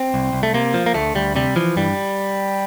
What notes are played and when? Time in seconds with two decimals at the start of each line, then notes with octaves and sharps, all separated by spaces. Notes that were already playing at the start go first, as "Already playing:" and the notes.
Already playing: C4
0.14 C2
0.33 C2
0.43 A3
0.54 C3 A#3
0.74 F3
0.86 A#3
0.94 D2 A3
1.15 D2 G3
1.36 C3 G3
1.56 E3 F3
1.77 G2 G3